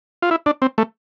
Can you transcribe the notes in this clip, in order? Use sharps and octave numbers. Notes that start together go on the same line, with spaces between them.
F4
E4
D4
C4
A3